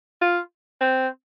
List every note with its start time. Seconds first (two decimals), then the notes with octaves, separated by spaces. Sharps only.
0.21 F4
0.81 C4